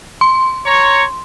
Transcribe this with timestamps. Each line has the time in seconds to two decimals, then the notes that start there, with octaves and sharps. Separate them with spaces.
0.21 C6
0.66 C#5 A#5 C#6